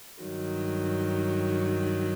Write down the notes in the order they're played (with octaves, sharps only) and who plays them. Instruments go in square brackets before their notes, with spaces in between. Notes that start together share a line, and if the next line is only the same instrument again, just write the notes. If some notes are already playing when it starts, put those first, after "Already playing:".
[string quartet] G2 D#3 F#3